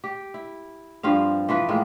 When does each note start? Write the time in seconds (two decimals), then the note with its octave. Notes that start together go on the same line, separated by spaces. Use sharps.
0.04 G4
0.34 E4
1.03 G2 F3 C4 F5
1.49 E3 F3 B4
1.69 A2 G#3 A#3